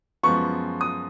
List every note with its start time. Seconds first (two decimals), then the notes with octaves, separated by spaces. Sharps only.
0.23 F#2 F3 G#3 B3 C#6
0.81 D#6